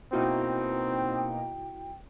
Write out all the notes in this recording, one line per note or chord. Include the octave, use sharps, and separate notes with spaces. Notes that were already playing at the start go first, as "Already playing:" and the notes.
B2 A#3 C4 D#4 E4 F#4 G5